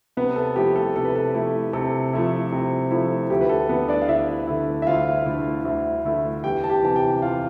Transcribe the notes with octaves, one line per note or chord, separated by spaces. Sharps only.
C3 B3 B4
A4
F3 A3 E4 G4
A4
C3 A4
B4
A4
F3 A3 E4
C3 A4
F3 A3 E4
C3
F3 A3 E4
D2 G4
B4
A4
D3 A3 B3 E4 B4
D4 D5
F5
D2 E4 E5
D3 A3 E4
E5
D2 F4 F5
D3 A3 E4
D2
D3 A3 E4
E2 G4 G5
A5
G4 G5
C3 E3 A5
G4 G5
E2 F4 F5